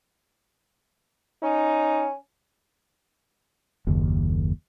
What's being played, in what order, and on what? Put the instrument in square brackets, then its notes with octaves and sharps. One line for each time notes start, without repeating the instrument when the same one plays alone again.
[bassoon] C#4 [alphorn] D#4
[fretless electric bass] F#1 D#2